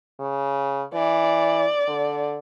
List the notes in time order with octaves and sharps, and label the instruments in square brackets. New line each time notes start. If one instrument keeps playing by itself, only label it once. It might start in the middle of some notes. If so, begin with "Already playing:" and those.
[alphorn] C#3
[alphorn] E3 [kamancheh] D5
[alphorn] D3